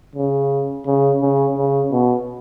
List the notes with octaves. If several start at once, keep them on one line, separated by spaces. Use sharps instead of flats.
C#3
C#3
C#3
C#3
B2